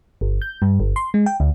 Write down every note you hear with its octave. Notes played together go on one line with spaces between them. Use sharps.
G1
G6
G2
G1
C6
G#3
G5
D2